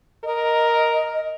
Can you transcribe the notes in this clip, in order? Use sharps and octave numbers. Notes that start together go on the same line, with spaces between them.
A#4 D#5